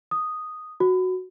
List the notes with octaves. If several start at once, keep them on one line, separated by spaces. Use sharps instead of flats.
D#6
F#4